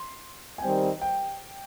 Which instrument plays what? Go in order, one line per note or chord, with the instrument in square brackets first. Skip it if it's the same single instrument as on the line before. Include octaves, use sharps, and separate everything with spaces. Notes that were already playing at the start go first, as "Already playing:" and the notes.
Already playing: [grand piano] C6
G#5
[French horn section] D#3 G3 C4 [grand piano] G5
[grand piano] G5